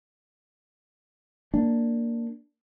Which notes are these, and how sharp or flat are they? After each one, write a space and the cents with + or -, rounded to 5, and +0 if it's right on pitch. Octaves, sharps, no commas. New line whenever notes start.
A#3 -5 D4 +0